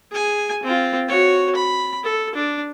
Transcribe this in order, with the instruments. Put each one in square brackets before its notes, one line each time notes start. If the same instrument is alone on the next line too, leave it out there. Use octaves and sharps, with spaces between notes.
[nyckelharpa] G#4 G#5
C4 F4
F#4 C#5
B5
A4
D4